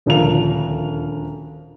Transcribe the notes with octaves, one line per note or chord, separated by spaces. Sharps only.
D#1 D2 F3 A#4 F7